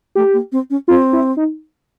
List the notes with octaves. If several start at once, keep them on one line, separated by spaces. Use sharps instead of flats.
A3 G4
A#3
C4
C#4
C4 F4
E4
D#4